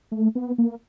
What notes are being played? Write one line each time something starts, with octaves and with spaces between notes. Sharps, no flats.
A3
B3
A#3